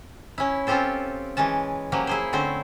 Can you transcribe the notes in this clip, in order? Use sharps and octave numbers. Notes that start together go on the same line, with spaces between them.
C#4 E4
C4 C#4 F4 G4 A4 C5
E3 G#3 C#4 A5
F3 F#3 A#3 C#4 G4
E4 G#4 C5
D3 A3 C4 C#4 C5